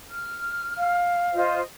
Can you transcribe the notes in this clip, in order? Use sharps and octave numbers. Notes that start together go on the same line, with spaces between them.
F6
F5
F4 C5 D#5